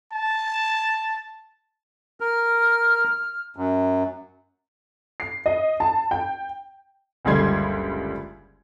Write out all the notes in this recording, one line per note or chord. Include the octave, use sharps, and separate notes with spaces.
A5
A#4 F6
F#2
C7
D#5
A5
G5
F#1 C#2 D3 G3 C6 G#6